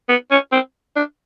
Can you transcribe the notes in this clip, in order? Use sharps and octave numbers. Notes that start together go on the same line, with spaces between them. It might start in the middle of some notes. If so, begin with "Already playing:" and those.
B3
C#4
C4
D4